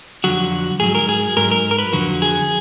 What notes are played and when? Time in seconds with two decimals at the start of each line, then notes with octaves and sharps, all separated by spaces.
0.24 F2 D3 F#3 F#4
0.80 G#2 F#3 G#4
0.95 A#4
1.09 G#4
1.37 G#2 F#3 A#4
1.51 A#4
1.71 A#4
1.78 B4
1.93 F2 D3 F#3 F#4
2.22 G#4